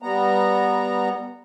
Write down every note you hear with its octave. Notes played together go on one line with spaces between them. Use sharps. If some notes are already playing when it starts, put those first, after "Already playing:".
G3 B3 A#5